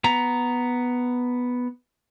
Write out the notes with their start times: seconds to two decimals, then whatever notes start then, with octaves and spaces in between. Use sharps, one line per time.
0.04 B3 A#5